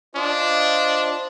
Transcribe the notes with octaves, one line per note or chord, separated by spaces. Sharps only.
D4 F4 C5 D#5